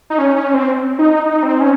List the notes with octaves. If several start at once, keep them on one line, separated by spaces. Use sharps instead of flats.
D#4
C#4
C#4
C4
D#4
D#4
C4
C#4